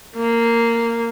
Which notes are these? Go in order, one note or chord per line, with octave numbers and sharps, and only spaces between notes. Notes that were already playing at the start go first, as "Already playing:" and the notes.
A#3